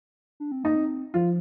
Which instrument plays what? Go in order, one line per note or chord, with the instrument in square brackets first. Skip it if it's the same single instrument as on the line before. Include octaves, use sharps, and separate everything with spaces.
[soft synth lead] D4
C4
[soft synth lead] A#3 [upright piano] D#4
[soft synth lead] C4
[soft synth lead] F3 [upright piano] F4